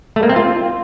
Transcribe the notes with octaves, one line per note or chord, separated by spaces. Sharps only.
A3
A#3
C4
F4